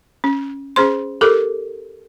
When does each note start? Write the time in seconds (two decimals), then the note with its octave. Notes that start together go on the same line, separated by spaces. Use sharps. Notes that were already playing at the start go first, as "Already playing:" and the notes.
0.24 C#4
0.76 C#4 G#4 C5 C6
1.21 G4 A4 A#4 D6